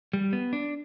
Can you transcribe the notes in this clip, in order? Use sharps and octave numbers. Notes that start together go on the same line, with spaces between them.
G3
B3
D4